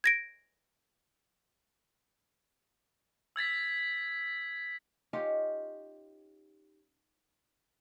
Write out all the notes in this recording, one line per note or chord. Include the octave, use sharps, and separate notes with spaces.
G#6 A#6 D7
E6 G#6 A6 B6
C#4 D#4 F4 G4